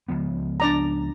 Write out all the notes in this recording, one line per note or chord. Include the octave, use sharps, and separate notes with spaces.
C#2 F3 B3
D4 D5 A#5